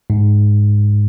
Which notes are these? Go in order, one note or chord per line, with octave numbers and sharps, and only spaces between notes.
G#2